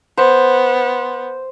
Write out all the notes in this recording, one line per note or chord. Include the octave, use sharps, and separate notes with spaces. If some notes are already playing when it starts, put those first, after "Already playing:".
B3 C5